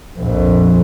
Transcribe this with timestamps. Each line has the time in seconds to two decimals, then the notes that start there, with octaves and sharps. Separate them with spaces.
0.19 A#1 F2